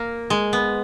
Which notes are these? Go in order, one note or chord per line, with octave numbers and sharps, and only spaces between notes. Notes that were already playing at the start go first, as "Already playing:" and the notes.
Already playing: A#3
G#3
B3